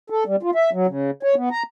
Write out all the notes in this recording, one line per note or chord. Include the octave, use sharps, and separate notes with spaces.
A4
G3
F4
E5
F#3
C#3
C#5
B3
A#5